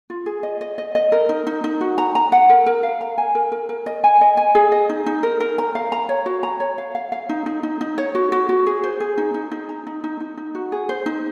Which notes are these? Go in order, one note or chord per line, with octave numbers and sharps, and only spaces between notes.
F4
G#4
D#5
D#5
D#5
D#5
A#4
D#4
D#4
D#4
F#4
A#5
A#5
F#5
A#4
A#4
F5
A#5
G#5
A#4
A#4
A#4
D#5
G#5
D#5
G#5
G#4
D#5
D#4
D#4
A#4
A#4
A#5
F5
A#5
C#5
F#4
A#5
C#5
F5
F5
F5
D#4
D#4
D#4
D#4
C#5
F#4
F#4
F#4
G#4
C5
G#4
D#4
D#4
D#4
A#5
D#4
D#4
D#4
D#4
F#4
G#4
C5
D#4